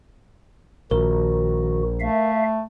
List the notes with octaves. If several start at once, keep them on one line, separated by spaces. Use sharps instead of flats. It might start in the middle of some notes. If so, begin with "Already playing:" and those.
A#1 D#3 F#4 A#4
A3 E5 F5